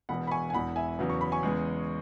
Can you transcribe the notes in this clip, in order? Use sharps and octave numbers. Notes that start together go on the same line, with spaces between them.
E1 E2 B2 F#5 B5
B5
G#5 C#6
G#5
E1 E2 E3 F#5 B5
E5 G#5
E2 C#3 F#3 B3
C#6
B5
G#5 C#6
E2 C#3 G#3 B3